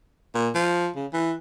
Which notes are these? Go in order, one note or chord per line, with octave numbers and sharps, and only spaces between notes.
A#2
F3
C#3
E3